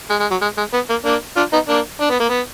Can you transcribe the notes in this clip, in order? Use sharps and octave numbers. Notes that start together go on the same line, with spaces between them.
G#3
G#3
F#3
G#3
G#3
B3
A#3
A#3 D4
D4 F4
B3 D#4
A#3 D4
D4
B3
A#3
B3